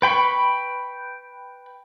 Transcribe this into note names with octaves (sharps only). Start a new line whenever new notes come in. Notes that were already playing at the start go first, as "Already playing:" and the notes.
B4 G5 B5 C#6